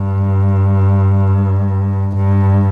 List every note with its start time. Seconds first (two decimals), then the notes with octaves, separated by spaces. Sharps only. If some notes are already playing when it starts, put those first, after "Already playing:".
Already playing: G2
2.16 G2